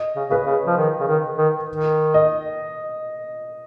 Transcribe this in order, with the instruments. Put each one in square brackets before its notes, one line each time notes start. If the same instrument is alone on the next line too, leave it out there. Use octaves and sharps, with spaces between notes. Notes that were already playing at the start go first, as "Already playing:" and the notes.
Already playing: [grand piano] D#5
[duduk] C#3
[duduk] C#3 [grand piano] B4
[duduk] C#3
F3
D#3
C#3
D#3
D#3
D#3
[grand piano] D#5